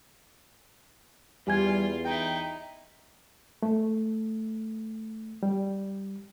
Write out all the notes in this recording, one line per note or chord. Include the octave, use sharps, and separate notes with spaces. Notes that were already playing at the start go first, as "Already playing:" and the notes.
E2 G3 F4 G4 G#5 G#6
D#4 E4 G5
A3
G3